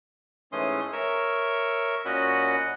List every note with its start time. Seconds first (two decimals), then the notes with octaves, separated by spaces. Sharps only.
0.52 G#2 E3 A3 C#4 C6 D#6
0.93 A#4 C#5 E5
2.05 A#2 C#4 F#4 D#5 F#5 B5